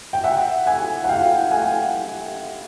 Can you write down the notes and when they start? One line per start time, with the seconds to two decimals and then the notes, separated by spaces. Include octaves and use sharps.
0.13 G5
0.24 E5 F#5
0.66 F#5 G#5
1.04 F#5
1.09 F5 G5
1.51 F#5 G#5